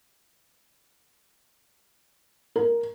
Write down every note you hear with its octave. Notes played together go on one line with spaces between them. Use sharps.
A#4